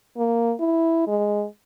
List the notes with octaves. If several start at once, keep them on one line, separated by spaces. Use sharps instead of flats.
A#3
E4
G#3